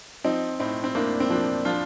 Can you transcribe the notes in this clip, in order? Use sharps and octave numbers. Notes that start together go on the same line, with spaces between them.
F3 C4 D#4
A2 C4 D#4
C4
A2 A#3 D4
C4
F3 A#3 D4
F3 D4 F4